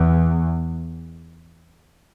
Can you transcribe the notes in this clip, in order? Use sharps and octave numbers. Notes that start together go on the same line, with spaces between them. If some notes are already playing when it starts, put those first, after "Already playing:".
Already playing: E2